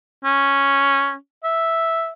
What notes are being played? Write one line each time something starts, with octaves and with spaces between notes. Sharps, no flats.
C#4
E5